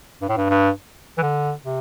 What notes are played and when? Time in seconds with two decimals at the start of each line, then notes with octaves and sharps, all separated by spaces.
0.22 G2
0.29 A2
0.37 G2
0.50 G2
1.18 E3
1.23 D3
1.65 C3